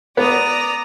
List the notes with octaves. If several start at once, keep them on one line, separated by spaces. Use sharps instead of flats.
B3 D5 A#5 D#6